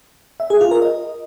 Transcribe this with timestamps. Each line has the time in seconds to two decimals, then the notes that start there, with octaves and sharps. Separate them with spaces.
0.40 E5
0.50 G#4
0.61 F4
0.71 A#4
0.82 D#5